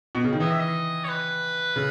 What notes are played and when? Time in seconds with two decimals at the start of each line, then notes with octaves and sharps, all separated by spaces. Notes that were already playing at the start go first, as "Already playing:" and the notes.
0.15 B2
0.24 C#3
0.33 D#3
0.40 E3 D#5
0.50 E5
0.59 D#5
1.04 C#5
1.08 B4
1.76 C#3